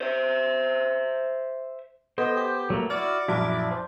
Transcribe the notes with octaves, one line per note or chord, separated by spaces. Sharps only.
C5 E5
B3 A4 C5 D#5
G4
F#3 A3 A#3
E4 F#4 D5 F6
A#1 F#2 E4 F#4 A5 D6
C5